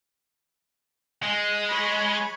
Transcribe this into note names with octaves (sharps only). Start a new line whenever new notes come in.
G#3
C#5 B5